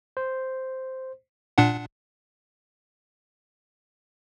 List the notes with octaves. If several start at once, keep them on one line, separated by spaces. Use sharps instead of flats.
C5
A#2 D4 F#5